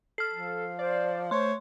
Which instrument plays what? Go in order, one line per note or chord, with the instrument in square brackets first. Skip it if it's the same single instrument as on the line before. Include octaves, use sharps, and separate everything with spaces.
[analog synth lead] A4 [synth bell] F6 C7
[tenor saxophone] F3
[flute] C5 [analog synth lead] D5
[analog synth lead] A3 [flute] C5 [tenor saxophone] C#5 [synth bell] C6